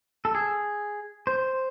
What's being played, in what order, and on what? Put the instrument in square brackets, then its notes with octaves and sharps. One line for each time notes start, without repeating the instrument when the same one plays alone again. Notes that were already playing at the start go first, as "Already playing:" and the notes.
[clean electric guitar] A4
G#4
C5